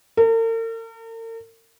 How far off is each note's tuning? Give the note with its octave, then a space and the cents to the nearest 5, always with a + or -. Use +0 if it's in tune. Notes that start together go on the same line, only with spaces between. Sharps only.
A#4 -45